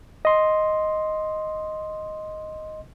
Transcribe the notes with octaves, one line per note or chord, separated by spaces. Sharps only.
D#5 C6